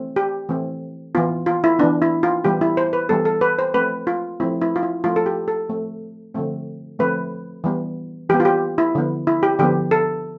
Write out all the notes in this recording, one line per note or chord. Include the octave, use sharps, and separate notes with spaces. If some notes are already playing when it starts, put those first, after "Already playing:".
Already playing: E3 A3 C4
G4
E3 A3 C4
E3 B3 F4
F4
E4
E3 B3 D4
E4
F4
E3 G3 B3 G4
E4
C5
B4
E3 G3 B3 A4
A4
B4
C5
F3 A3 C4 B4
F4
F3 A3 C4 E4
E4
F4
E4
F3 A3 C4 F4
A4
G4
A4
F3 A3 C4
D3 F3 A3 C4
D3 F3 A3 C4 B4
E3 G3 B3
E3 G3 B3 G4
F4
G4
E4
D3 F3 B3
E4
G4
D3 F3 B3 G4
A4